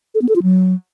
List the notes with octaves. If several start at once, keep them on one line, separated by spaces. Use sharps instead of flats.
A4
B3
A4
F4
F#3